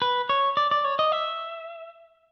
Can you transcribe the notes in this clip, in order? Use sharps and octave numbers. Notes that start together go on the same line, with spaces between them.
B4
C#5
D5
D5
C#5
D#5
E5